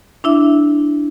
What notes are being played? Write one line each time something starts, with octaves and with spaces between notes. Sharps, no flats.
D4 E4 E5